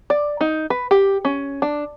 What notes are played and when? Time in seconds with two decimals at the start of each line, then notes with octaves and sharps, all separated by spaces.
0.10 D5
0.41 D#4
0.70 B4
0.91 G4
1.25 C#4
1.62 D4